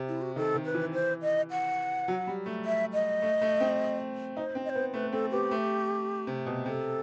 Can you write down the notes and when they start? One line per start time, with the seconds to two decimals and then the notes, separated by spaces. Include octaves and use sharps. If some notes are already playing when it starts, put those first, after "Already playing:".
Already playing: C3
0.08 E4
0.22 F#4
0.36 D#3 A4
0.55 D#3
0.65 B4
0.75 E3
0.94 C5
1.22 D#5
1.51 F#5
2.08 F#3
2.27 G3
2.46 A3
2.65 E5
2.93 D#5
3.22 A3
3.42 A3
3.60 C4
4.36 D#4 C5
4.55 C4
4.65 D#5
4.69 C5
4.75 B3
4.94 A3 B4
5.12 C4 A4
5.31 B3 G4
5.51 A3
6.27 C3
6.46 B2
6.65 C3 A4